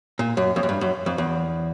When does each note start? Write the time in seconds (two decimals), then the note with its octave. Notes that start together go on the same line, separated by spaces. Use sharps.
0.19 A#2
0.37 F#2
0.56 F2
0.63 F#2
0.69 G2
0.81 F#2
1.06 F2
1.18 E2